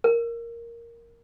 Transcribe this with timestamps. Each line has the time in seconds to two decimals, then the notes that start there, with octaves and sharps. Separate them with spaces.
0.04 A#4